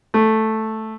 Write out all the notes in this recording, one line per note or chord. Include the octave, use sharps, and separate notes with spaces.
A3